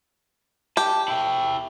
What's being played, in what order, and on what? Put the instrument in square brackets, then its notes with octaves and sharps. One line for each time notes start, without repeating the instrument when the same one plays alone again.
[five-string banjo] G4 [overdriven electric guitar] A5
[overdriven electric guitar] E4 G5